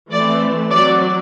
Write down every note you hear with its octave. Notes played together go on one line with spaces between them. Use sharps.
E3 A3 C4 D5
F#3 C4 D5